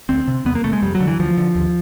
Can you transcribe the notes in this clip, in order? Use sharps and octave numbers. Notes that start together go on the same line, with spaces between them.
D2 C4
C3
E2 B3
A#3
C3 A3
G#3
F2 G3
F#3
D3
E3
D2 F3
D3
D#2